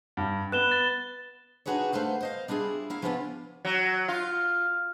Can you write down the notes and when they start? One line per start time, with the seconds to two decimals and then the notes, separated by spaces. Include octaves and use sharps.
0.17 G2
0.52 B3 F#6 E7 G7
0.71 A6
1.66 D4 D#4 F#4 G#4 B4 C#5
1.93 A3 B4 C5 F5 F#5
2.21 C5 D#5 F5
2.48 G3 D4 E4 F4 G#4
2.90 A#3 E4 F5
3.02 F3 B3 C#4 D4 E4 F4
3.65 F#3
4.08 F4